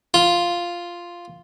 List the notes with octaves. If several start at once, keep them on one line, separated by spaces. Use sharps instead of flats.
F4